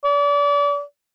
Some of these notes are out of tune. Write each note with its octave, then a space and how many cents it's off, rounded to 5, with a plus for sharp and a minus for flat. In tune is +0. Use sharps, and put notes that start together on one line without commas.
D5 -35